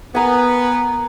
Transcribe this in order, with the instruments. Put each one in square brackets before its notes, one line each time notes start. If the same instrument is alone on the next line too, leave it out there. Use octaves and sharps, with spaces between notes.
[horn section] B3 [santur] A#4 G#5